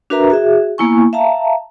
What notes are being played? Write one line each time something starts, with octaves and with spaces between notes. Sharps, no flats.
D4 F#4 A#4 B4 E5 A#5
F#4 G#4 E5
A#3 B3 E4 G#5 C#6
E5 F5 A5 A#5